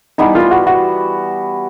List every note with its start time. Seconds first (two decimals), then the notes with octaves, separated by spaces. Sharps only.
0.18 E3 G3 B3 D#4 E4
0.35 F4
0.51 F#4
0.67 F#4